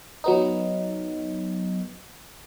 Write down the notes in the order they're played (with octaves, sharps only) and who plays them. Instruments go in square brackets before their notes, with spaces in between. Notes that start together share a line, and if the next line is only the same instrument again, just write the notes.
[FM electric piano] F#3 B3 D#4